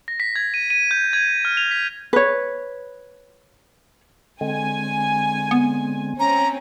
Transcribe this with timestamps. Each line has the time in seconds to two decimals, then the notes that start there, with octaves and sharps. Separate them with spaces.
0.08 A#6
0.20 B6
0.36 G#6
0.54 D#7
0.70 D#7
0.91 G6
1.13 G#6
1.45 F6
1.57 F7
1.71 B6
2.13 B4 C#5
4.41 D3 G#3 C4 G#5
5.51 B3
6.20 C4 C#4 A#5